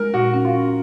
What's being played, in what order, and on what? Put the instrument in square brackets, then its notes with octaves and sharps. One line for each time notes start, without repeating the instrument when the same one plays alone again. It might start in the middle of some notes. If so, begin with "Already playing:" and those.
Already playing: [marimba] G#3 [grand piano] A#4
[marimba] A#2 [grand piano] F#4
[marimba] C#4
[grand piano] F4
[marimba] C#4